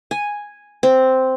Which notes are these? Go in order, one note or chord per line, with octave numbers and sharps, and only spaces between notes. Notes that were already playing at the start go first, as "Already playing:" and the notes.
G#5
C4